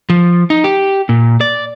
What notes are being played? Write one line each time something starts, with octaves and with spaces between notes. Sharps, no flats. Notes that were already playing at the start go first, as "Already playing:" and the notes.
F3
D#4
G4
A#2
D5